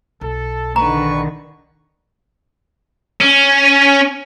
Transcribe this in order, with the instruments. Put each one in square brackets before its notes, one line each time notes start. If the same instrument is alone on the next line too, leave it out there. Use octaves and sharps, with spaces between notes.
[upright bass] B1 [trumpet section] A4
[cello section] D3 D#3 [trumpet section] B4 C#6 [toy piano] A#5
[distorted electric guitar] C#4